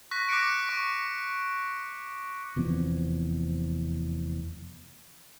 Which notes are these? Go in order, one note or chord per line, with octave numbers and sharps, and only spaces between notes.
C#6 F#6 A#6 B6
D6 F#6 A#6 B6 C#7 D7
C#6 D7
F1 E2 F3 C4